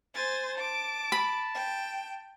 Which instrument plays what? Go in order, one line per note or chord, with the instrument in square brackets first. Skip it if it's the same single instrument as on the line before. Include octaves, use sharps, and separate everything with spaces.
[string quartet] C5 G#5 A6
[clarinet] A5 [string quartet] D6
[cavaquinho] B5
[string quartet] G5